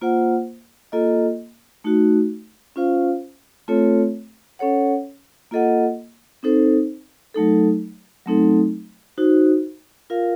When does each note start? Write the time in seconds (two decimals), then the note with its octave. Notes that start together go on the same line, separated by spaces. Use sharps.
0.01 A#3 F4 C5 F#5
0.92 A#3 F4 A4 D#5
1.84 A3 D#4 F#4
2.76 C#4 F4 C5 F5
3.68 A3 C4 F4 A4 C#5
4.59 C#4 A4 C#5 F#5
5.51 A#3 F4 A4 D#5 F#5
6.43 C4 D#4 A4 C5
7.34 F#3 A3 D#4 A4
8.26 F#3 A3 C4 D#4 A4
9.18 D#4 F#4 C5
10.10 F4 A#4 F5